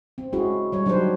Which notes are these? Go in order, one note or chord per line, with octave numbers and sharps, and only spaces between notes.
C4
G#3 C#4 E4 F#4 G#4
G3 C#5
F#3 D4 D#4 G4 B4 C5